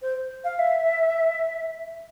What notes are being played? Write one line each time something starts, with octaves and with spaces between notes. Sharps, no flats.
C5
F5
E5